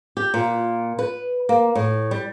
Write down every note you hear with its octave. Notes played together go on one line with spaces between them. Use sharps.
G4
A#2
B4
A#3
A2
G3